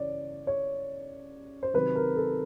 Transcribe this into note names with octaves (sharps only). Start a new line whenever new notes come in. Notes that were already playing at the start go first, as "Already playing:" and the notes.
Already playing: C#3 E3 C#5 D5
C#5
C5
C3 D#3 F#3 B4
A#4
A4